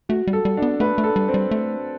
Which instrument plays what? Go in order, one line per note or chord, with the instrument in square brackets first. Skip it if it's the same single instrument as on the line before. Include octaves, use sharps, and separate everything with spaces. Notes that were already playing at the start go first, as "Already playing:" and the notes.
[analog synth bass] A3 [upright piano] F#4
[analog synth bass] G3
[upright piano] A4
[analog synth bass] G3
[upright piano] D4
[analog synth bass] B3
[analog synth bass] A3 [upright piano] B4
[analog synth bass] A3
[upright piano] A4
[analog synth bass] G3
[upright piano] C4
[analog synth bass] G3
A3